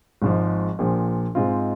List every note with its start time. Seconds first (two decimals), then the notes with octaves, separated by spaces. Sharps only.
0.22 G#1 G#2 F3
0.79 A#1 A#2 F3
1.35 G#2 G#3 C4 F4